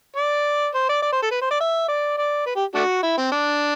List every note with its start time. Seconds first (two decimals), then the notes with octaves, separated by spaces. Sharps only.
0.16 D5
0.74 C5
0.89 D5
1.02 D5
1.12 C5
1.22 A4
1.31 B4
1.41 C5
1.51 D5
1.60 E5
1.88 D5
2.18 D5
2.46 B4
2.56 G4
2.75 A3 D4 F#4
3.03 E4
3.18 C4
3.32 D4